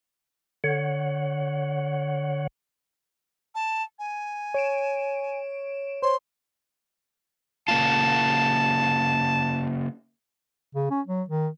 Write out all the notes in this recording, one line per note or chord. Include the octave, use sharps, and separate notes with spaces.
D3 C#5 F#5
A5
G#5
C#5 D7 E7
C5 C#5 C6
C#3 A#3 F4 A5
C#3
C#4
F#3
D#3